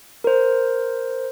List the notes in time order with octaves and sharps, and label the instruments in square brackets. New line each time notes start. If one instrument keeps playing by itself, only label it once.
[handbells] A#4 C5